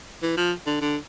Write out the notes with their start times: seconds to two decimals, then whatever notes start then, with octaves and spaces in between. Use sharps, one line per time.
0.22 E3
0.37 F3
0.67 D3
0.81 D3